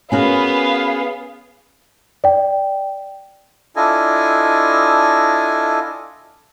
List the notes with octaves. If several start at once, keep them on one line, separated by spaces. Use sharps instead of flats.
B3 C#4 F#4 G#4 A#4 B4 F5
D5 G5
D4 E4 F4 A4 D#5 G#5